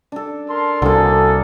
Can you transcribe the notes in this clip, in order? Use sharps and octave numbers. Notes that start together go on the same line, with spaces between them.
D4 A4
A#4 A5 C6
C2 D3 A#3 F#4 G#4 A4